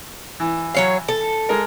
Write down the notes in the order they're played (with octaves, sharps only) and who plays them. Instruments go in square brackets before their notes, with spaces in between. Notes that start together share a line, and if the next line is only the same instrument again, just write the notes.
[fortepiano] E3
[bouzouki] F#3 C#5 F5
A4
[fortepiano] G#3 A#4